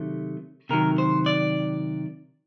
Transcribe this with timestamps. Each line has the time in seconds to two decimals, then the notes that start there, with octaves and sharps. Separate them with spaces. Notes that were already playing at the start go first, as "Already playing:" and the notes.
Already playing: C3 D#3 F#3 A3
0.69 C3 D#3 F#3 A#4
0.98 C5
1.26 D5